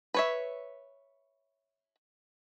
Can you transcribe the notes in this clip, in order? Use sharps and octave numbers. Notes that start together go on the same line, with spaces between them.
B4 C#5 E5